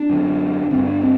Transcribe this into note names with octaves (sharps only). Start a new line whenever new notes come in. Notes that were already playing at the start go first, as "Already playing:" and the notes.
Already playing: D4
F#2 D3
G2 D3 C4
D4
C4